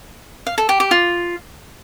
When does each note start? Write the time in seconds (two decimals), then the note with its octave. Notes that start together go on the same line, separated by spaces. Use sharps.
0.47 F5
0.58 A4
0.69 G4
0.80 G4
0.91 F4